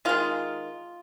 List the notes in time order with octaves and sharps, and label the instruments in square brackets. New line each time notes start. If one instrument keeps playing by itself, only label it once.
[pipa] D#3 G#3 F4